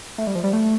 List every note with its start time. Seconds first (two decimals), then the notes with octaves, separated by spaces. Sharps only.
0.18 A3
0.27 G3
0.35 F3
0.44 G3
0.53 A3